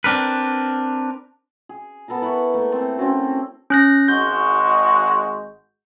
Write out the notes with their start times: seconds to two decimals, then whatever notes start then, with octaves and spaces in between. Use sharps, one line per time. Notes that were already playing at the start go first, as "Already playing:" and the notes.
0.04 C4 D4 A#4 B4
1.69 G#4
2.08 B3 A4 A#4 A#5
2.22 E4 F#5 B5 C#6
2.54 A3 A#3
2.72 C4 A4
2.97 C4 C#4 F#4 A4
3.70 C#4 F#6 A#6
4.08 G#1 G#3 F#4 G6